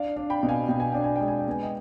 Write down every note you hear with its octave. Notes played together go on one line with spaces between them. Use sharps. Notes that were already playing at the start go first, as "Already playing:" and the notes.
Already playing: D4 D5 F5
D4
G5 B5
B2
F5 G#5
B2 G5
G#5
D4 G5
G#5
G5
G#3
G#5
G5
B3 G#5
D#5 G5